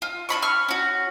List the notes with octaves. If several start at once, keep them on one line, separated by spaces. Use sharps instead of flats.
F4
D4 D5 B5 C#6
C#6 F6
C#4 F#4